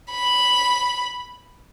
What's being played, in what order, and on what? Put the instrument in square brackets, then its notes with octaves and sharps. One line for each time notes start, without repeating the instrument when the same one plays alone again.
[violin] B5